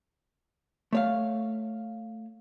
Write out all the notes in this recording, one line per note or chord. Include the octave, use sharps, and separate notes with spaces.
A3 C#5 F5